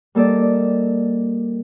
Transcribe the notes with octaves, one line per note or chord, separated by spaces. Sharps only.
G3 A#3 A4 D5 D#5